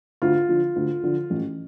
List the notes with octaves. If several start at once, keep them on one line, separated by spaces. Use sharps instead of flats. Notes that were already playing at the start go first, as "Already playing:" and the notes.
D2 F4
D3 F3
D2
D3 F3
A1